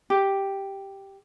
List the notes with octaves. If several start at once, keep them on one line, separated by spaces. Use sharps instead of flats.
G4